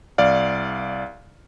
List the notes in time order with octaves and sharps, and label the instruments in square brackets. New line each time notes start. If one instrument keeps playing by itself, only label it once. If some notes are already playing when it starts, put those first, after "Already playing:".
[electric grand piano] C2 D5 F5